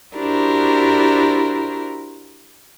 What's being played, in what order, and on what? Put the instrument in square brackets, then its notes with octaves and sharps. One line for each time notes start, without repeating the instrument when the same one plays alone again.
[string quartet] D4 E4 F#4 G4 A#4 C5